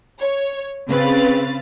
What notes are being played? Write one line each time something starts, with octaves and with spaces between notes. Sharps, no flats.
C#5
C#3 C4 B4 F5 A6